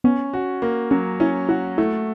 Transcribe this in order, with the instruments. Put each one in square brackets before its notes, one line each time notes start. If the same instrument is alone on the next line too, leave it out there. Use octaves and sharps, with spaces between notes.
[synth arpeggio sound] B3 [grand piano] C#4
[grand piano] F#4
A#3
[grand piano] F#3 [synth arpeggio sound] C#4
[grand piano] C#4 [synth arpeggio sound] E4
[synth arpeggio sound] E4 [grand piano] F#4
[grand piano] A3 [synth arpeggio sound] E4